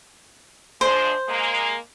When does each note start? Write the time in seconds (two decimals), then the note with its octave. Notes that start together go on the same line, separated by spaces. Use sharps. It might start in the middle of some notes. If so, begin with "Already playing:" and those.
0.81 F3 G#3 D4 C5
1.28 G#3 A#3